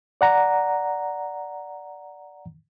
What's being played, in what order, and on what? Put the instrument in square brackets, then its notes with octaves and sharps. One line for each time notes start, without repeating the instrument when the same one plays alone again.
[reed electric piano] D5 F#5 A#5